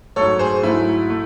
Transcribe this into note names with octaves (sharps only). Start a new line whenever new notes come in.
G#2 F#3 A3 A4 C#5
G#4 C5
G#2 F#3 A3 E4
A3